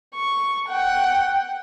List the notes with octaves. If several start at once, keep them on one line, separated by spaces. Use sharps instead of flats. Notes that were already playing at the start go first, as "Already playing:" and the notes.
C#6
F#5 G5